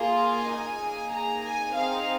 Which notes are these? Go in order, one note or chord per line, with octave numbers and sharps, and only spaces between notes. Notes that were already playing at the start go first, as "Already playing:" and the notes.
Already playing: A#3 F4 G#4
G#5
A#3 D#4 G#4
A#5
G#5
C4 D#4 G#4 F5